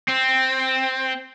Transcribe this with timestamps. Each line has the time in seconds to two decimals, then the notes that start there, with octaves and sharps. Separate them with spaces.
0.09 C4